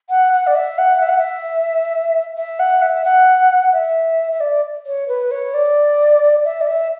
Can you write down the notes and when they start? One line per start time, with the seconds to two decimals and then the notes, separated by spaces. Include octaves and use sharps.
0.09 F#5
0.32 F#5
0.46 D5
0.55 E5
0.78 F#5
1.00 E5
1.08 F#5
1.17 E5
2.36 E5
2.59 F#5
2.81 E5
3.04 F#5
3.72 E5
4.32 E5
4.40 D5
4.86 C#5
5.08 B4
5.31 C#5
5.53 D5
6.44 E5
6.61 D5
6.67 E5